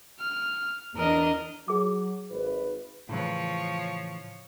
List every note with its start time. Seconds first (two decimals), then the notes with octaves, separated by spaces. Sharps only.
0.20 F6
0.97 E2 D4 A#4 D#5
1.68 F#3 G#4 D6
2.31 G#1 B4
3.09 A2 C#3 E3 F3 C#5